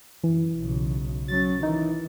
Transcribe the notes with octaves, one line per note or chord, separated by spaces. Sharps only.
F#2 E3
B1 C#3
F#3 C#4 A6
D#3 E3 D#4